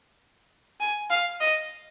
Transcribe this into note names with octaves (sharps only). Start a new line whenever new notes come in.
G#5
F5
D#5